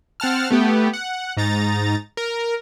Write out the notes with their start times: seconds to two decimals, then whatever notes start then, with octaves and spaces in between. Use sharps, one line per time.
0.20 C4 F#5 A5 F6
0.51 A3 B3 G4
0.93 F#5
1.37 G#2 D#4 A#5 A6
2.17 A#4